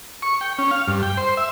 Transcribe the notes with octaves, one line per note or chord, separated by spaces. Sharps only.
C#6
G5
C#4
F5
G2
G5
C5
E5